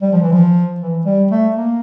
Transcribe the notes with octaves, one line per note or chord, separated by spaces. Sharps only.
G3
F3
E3
F3
E3
G3
A3
A#3